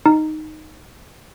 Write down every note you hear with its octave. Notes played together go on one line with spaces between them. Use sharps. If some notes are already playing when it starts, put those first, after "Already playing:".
D#4